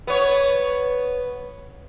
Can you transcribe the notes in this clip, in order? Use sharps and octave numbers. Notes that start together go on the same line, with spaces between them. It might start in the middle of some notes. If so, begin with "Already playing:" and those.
B3 C#5